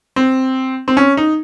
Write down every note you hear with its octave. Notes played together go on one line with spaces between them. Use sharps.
C4
C4
C#4
D#4